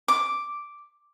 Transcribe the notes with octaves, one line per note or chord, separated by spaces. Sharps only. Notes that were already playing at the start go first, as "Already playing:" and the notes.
D6